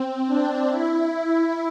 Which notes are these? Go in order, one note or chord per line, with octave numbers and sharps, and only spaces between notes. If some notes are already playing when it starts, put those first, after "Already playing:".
Already playing: C4
D4
E4